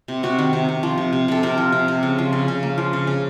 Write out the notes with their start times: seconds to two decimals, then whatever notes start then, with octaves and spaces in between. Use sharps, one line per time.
0.08 C3
0.23 C3 F#4
0.39 D#3
0.53 C3
0.68 C3
0.83 F3
0.98 C3
1.13 C3
1.28 C3 A4
1.43 C3 A#4
1.58 F3
1.72 C3
1.88 C3
2.03 C#3
2.18 F3
2.33 C#3
2.48 C#3
2.63 A#3
2.78 F3
2.93 C#3
3.07 C#3